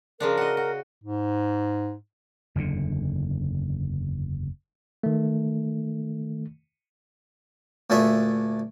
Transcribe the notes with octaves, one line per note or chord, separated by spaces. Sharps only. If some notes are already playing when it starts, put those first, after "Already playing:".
C#3 F3 D4 A#4
F#4 D#5
F#4
G#2
F#1 E2 A#2 D3
D#3 A3
D2 A#2 A3 D4 G#4 E5